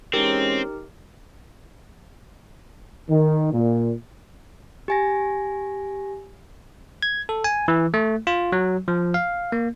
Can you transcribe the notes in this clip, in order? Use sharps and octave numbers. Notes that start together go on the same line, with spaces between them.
E3 G#3 C4 C#4 D#4 G4 A#4
D#3
A#2
G4 G#5 A#6
G#6
A4
G#5
E3
A3
F4
F#3
F3
F5
A#3